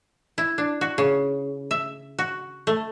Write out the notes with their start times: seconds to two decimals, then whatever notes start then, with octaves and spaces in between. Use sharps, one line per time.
0.38 E4
0.58 D4
0.81 F#4
0.98 C#3
1.71 E5
2.19 F#4
2.67 A3